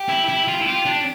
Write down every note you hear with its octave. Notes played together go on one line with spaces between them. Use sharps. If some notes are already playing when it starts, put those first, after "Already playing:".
Already playing: G4
E4
E4
F4
E4
F4 G4
D4